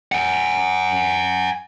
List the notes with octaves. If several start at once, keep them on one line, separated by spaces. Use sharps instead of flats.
F#5 G#5